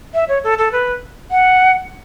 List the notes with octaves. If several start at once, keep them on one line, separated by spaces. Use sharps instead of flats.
E5
C#5
A4
A4
B4
F#5